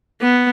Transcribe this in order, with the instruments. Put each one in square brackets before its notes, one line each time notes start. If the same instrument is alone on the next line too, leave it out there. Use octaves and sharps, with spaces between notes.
[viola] B3